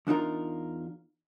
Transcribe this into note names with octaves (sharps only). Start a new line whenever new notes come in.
E2 D4 D#4 F4 A#4